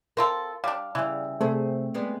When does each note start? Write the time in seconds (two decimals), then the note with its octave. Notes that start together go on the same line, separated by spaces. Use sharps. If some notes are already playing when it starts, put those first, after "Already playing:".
0.17 C4 F4 A4 A#4
0.64 G3 D4 F5
0.95 C#3 E3 G3
1.41 C3 A3 C4 G#4 C5
1.94 G3 G#3 B3